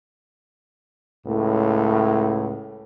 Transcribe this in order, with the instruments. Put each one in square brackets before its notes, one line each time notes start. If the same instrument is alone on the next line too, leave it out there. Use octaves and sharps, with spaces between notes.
[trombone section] C#2 A2